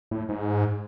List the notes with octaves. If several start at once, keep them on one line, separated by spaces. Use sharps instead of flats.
A2
G#2